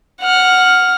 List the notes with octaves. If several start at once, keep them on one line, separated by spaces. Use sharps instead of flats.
F#5 F6